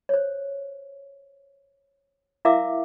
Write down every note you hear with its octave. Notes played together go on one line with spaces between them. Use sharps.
C5 C#5
E4 A#4 E5 F5 D6 E6